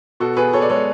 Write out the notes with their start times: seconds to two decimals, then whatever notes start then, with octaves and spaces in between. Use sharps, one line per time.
0.20 B2 F#4 A4
0.37 B2 G#4 B4
0.53 B2 A4 C#5
0.62 D5
0.70 G#3 A4 C#5